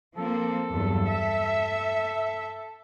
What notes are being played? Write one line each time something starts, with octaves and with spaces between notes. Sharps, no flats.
F3 A#3 C4 A4
E2 G2 F#3
E5